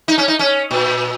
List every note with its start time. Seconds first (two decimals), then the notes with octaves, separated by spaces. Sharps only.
0.08 D#4
0.18 C#4
0.28 D#4
0.39 C#4
0.71 A#2